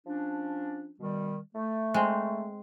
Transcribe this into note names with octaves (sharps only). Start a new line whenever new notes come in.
F3 C#4 D4
B2 D#3 G3
A3
G#3 C4